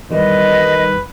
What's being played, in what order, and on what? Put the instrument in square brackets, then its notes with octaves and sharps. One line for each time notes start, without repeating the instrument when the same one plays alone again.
[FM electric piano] E2 G3 [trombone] D#3 [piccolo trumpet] B4 [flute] D#5